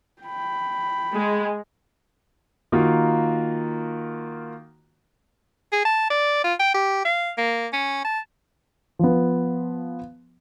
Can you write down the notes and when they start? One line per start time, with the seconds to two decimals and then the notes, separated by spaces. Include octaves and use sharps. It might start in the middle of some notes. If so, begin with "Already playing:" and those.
0.22 G5 B5
1.13 G#3
2.72 D#3 A#3 F4 F#4
5.72 G#4
5.85 A5
6.10 D5
6.44 F4
6.59 G5
6.74 G4
7.05 F5
7.38 A#3
7.73 C#4
8.05 A5
8.99 F3 B3